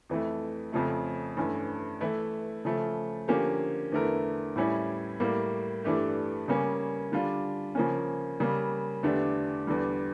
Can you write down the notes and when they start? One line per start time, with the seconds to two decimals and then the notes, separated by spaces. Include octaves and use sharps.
0.09 F2 E3 A3
0.72 F2 C#3 F3 A3
1.37 G2 E3 A3 C#4
2.01 E3 A3 E4
2.65 C#3 F3 A3
3.28 D3 F3 A#3 C#4 G4
3.92 E2 D3 A3 E4 A#4
4.56 A2 G3 C#4 E4
5.20 A2 G3 A#3
5.84 G2 E3 A3 D4 G4
6.48 C#3 G3 A#3 C#4
7.12 D3 G3 D4 F4
7.75 C#3 F3 A#3 C#4
8.40 C#3 G3 A#3
9.03 E2 D3 A3 D4 G4
9.67 E2 D3 G3